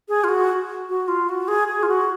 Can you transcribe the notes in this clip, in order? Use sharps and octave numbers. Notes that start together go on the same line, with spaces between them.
G#4
F4
F#4
F#4
F4
F#4
G#4
G#4
F4
F#4